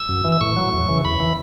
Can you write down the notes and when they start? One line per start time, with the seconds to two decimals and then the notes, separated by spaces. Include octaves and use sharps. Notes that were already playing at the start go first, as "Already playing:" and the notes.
Already playing: E6
0.09 F#2
0.25 E3
0.32 E6
0.41 A2 C#6
0.57 F#3
0.73 E2
0.88 C#3 E3
1.04 E2 B5
1.20 E3